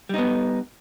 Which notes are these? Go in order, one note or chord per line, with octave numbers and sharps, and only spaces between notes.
G3 B3 D#4